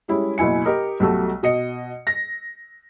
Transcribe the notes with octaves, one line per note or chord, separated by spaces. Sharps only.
G3 G#3 C#4 E4
F#1 B2 E4 G#5 C#7
G4 A#4 D#5
B1 G3 A3 F#4
B2 D#5 C#7
A#6